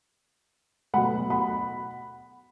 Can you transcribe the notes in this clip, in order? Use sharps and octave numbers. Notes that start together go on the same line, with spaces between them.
B2 F#3 A3 F#5 B5
F#5 B5